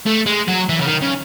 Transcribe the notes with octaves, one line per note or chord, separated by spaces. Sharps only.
A3
G#3
F#3
E3
C#3
D#3
C#3